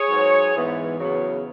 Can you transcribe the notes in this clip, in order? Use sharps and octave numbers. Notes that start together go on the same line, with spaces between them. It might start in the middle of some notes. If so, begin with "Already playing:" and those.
Already playing: G#4 C#5
G#2 F#3 B3
G#2 E3 B3
E2 C#3 F#3 B3